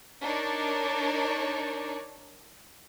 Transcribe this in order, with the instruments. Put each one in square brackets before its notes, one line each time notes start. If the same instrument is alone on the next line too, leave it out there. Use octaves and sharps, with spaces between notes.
[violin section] D4 D#4 A#4 C#5 D5